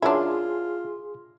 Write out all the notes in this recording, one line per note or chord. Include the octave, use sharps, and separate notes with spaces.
F#2 D4 E4 F4 G#4 E5 C6